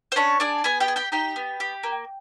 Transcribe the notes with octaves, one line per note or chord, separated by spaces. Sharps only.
C5
C#4 D4 C#5
D4 G#4 D5
B3 G#4 G#5
G4 G5
G#4
G4 G5
D#4 G4 G5
B3
G4
A#3